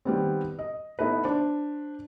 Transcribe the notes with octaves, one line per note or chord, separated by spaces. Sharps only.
D#3 G3 B3 C4
D#5
B3 D#4 E4 A4 B4
D4 C5